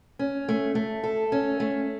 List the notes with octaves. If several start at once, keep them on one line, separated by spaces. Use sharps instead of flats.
C#4
A3
A3
A4
C#4
A3